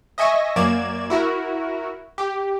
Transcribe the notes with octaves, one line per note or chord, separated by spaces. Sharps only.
D#5 E5 G#5 C#6 A#6
F#2 A#3 D5 G#6 E7
E4 F#4 A#4
G4